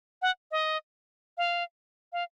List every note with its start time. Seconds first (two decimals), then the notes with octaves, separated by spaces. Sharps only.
0.22 F#5
0.51 D#5
1.38 F5
2.13 F5